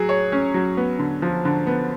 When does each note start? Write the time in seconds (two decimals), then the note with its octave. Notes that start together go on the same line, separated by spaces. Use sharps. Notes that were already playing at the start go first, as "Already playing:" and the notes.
Already playing: F#3 G#4
0.09 C#5
0.32 C#4
0.54 F#3
0.77 B3
0.99 D3
1.22 F3
1.45 D3
1.67 B3